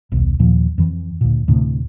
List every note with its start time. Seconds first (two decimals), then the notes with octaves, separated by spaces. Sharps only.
0.12 D#1 B1
0.40 D#2 A#2 F3
0.78 F2 E3
1.21 D2 A#2
1.48 D2 A2 C3